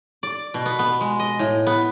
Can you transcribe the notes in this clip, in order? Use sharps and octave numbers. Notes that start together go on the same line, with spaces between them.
D5
B2
B3
B3
G#3
D#5
A2
B3